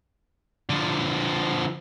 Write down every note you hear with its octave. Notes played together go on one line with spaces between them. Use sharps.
D3 F3